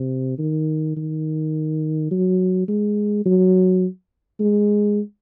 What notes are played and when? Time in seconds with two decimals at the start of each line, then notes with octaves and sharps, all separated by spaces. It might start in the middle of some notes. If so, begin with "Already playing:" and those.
Already playing: C3
0.38 D#3
0.97 D#3
2.11 F#3
2.68 G#3
3.26 F#3
4.40 G#3